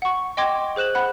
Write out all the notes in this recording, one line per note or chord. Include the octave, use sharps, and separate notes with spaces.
F#5 C#6
D#5 G5 C6 D6 G#6 A#6
G#4 C5 F#6 E7 F#7
F#5 B5 F#6